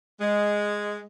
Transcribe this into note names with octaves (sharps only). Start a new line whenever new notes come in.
G#3